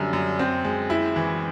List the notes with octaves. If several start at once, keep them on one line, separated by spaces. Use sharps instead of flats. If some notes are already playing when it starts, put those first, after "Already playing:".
Already playing: F#2 D3 G3
F#2
C4
G#3
E4
E3